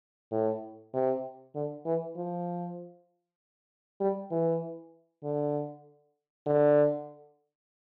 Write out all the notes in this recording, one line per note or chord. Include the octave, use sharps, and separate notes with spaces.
A2
C3
D3
E3
F3
G3
E3
D3
D3